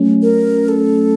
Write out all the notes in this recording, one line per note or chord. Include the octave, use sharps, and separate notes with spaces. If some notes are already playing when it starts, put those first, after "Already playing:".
Already playing: F#3 A3 C#4
A#4
A4